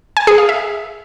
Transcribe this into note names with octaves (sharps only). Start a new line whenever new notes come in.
G#5
G#4
F5
E5